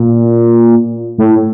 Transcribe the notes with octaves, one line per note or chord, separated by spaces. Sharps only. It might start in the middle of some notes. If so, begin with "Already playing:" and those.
Already playing: A#2
A2